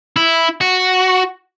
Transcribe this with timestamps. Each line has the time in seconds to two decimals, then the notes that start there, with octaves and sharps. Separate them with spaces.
0.16 E4
0.61 F#4